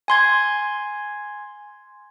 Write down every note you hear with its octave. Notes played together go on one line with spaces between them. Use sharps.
G#5 C6 G#6